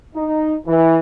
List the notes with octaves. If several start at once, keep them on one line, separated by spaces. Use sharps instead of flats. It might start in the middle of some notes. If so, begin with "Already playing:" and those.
D#4
E3